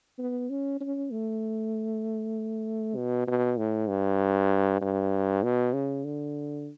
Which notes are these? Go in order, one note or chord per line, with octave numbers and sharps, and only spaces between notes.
B3
C#4
C#4
A3
B2
B2
A2
G2
G2
B2
C#3
D3